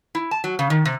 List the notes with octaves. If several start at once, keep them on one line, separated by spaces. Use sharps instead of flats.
E4
A5
F#3
C#3
D#3
C3